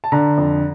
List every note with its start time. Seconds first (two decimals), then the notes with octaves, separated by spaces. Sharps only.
0.04 A5
0.12 D3 A#5
0.38 F2